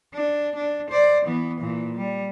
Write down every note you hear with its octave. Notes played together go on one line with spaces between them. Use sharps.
D4
D4
C5 D5
E3 B3
A#2 E3
G3